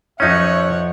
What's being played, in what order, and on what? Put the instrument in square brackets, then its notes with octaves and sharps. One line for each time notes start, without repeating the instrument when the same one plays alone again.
[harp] F2 D#7 [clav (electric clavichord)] C#4 D#4 [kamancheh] C#5 F#5 [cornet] E5